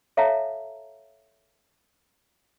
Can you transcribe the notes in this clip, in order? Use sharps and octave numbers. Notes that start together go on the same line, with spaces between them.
A4 C#5 E5 F5 A5 A#5